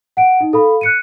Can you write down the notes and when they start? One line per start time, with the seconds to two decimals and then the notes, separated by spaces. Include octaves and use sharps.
0.17 F#5 D7
0.40 D#4
0.53 A4 F5 B5
0.81 F#6 C#7 D#7